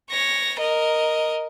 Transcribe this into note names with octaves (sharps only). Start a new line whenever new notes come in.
C#5 A#6
A#4 D#5